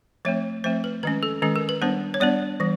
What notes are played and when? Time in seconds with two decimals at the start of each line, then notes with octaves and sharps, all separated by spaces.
0.25 F3 A3 C4 C#5
0.64 F3 A3 C4 C5
0.84 B4
1.03 D#3 G#3 C#4 B4
1.23 A4
1.42 D#3 G#3 C#4 A4
1.56 A#4
1.69 B4
1.82 G3 B3 D4 C5
2.14 C#5
2.20 G3 B3 D4 D5
2.60 E3 G3